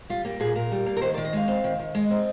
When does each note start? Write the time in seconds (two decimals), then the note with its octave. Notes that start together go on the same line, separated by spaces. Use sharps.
0.09 G3 F4
0.25 A#3 G4
0.40 A#2 G#4
0.55 A#2 A#4
0.72 G3
0.86 A#3
0.97 A#4
1.01 D#3 C5
1.14 D5
1.18 D#3
1.25 D#5
1.33 G#3 F5
1.48 C4
1.64 D#3
1.79 D#3
1.95 G#3 D#5
2.10 C4